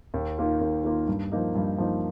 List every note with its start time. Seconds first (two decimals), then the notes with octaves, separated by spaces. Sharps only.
0.14 D#2
0.38 D#3 A#3 F4
0.61 D#2
0.84 D#3 A#3 F4
1.08 G2
1.32 F3 A#3 D#4
1.55 G2
1.78 F3 A#3 D#4